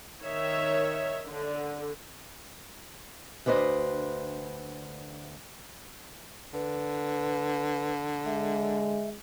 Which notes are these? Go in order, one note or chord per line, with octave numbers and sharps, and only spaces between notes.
D#3 C#5 E5
D3
D2 D4 B4 C5 D#5
D3 B4
G#3 E5